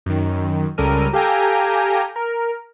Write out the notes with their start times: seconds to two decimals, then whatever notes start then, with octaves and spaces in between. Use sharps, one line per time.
0.06 F#2 D#3
0.78 C#2 C#3 G3 A4 A#4 D#7
1.13 G4 A4 F5 G5 G#5 A#5
2.16 A#4